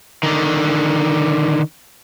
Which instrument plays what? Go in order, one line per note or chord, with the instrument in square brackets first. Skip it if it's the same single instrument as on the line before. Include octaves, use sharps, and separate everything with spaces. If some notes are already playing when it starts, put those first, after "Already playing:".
[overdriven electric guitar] D3 D#3